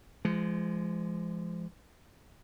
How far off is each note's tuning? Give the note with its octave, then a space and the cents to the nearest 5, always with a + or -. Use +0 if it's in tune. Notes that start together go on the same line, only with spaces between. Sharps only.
F3 -35 G#3 +0